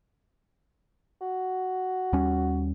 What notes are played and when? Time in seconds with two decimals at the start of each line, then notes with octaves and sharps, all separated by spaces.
1.21 F#4
2.13 D#2 G3 C#4